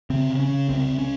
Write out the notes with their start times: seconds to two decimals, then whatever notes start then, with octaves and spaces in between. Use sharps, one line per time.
0.10 C#3 C4
0.30 C#3
0.39 C#4
0.49 C#3
0.69 C2 C4
0.90 C2
0.99 C#4